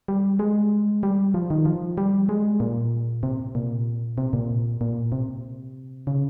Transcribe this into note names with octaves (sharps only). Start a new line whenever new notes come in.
G3
G#3
G3
F3
D#3
F3
G3
G#3
A#2
C3
A#2
C3
A#2
A#2
C3
C#3